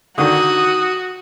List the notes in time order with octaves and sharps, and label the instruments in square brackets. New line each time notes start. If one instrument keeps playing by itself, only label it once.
[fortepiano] D3 D#3 [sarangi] F#4 [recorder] D#6